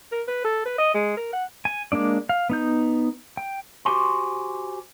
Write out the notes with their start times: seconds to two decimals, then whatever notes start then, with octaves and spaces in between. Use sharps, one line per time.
0.12 A#4
0.28 B4
0.44 A4
0.65 B4
0.78 D#5
0.94 G#3
1.17 A#4
1.33 F#5
1.65 G#5
1.92 G#3 A#3 D4 D5
2.29 F5
2.50 B3 D#4 G6
3.37 G5
3.85 F#4 G4 C5 G#5 C6